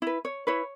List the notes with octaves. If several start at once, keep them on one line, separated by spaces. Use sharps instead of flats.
E4 B4
C#5
E4 B4 C#5